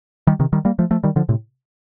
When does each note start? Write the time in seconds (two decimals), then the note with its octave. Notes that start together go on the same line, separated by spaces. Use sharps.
0.27 D#3 G3
0.39 C3 D#3
0.53 D#3 G3
0.65 G3 A#3
0.79 F3 A3
0.91 F3 A3
1.03 D#3 G3
1.16 D3 F3
1.29 A2 C3